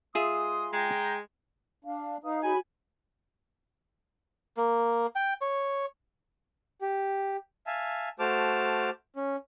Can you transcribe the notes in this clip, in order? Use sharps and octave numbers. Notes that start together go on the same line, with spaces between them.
G#3 F4 G#4 E5 C6 D#6
G#3 G5 A#5
D4 F5
D#4 B4 F5 D#6
F#4 G#4 C#5 G#5 B5
A#3
G5
C#5
G4
E5 F5 G#5 A5
A3 F#4 C5 A5 D6 F6
C#4